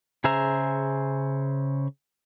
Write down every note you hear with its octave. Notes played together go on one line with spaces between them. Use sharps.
C#3 G#4 C5 E5 A#5